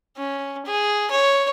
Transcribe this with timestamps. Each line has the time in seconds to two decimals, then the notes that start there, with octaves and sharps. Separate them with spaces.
0.17 C#4
0.66 G#4
1.11 C#5